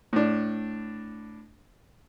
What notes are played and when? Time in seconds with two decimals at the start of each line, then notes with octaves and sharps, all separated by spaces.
0.13 A2 D4